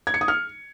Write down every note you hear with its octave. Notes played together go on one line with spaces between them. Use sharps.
G#6
C#7
D#6
F6